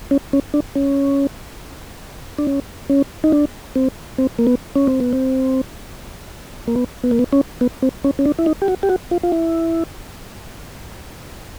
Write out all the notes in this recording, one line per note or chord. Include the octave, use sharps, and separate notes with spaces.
C#4
C#4
D4
C#4
D4
C#4
C#4
D#4
D4
C4
C4
A#3
B3
C#4
C4
B3
C4
A#3
B3
B3
A#3
B3
C#4
B3
C4
C#4
C#4
D4
E4
D#4
G4
F#4
G4
F#4
F4
F4
E4